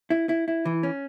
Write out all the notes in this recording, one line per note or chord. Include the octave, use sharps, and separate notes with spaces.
E4
E4
E4
E3
C#4